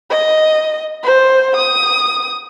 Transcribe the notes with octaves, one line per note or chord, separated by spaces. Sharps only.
D#5
C5
D#6